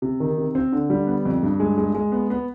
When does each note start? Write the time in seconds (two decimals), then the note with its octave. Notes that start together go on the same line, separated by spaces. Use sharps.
0.02 C3
0.20 D#3
0.37 C3
0.55 C4
0.72 D3
0.90 G3
1.07 B3
1.25 F2
1.43 G2
1.60 G#3
1.78 G#3
1.95 G#3
2.12 B3
2.30 B3